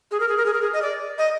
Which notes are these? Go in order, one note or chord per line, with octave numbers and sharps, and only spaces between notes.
G#4
A#4
G#4
A#4
G#4
A#4
G#4
D#5
D5
D#5